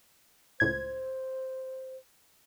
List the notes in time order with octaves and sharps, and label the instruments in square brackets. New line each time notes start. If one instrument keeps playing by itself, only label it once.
[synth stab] C#2 A2 G#6 [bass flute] C5